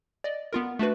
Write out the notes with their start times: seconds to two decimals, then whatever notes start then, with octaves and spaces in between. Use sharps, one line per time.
0.24 D5 D#5
0.53 B3 F4 A#4
0.79 A3 D4 F#4 B4